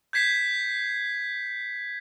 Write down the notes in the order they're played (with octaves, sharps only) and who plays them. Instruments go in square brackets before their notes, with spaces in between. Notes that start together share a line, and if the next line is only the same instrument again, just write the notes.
[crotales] G6 G#6 B6 C7